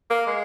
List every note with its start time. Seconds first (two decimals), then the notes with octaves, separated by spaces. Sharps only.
0.10 A#3
0.27 G#3